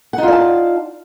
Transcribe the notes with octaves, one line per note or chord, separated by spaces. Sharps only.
D#4 F4 D5 F#5 A5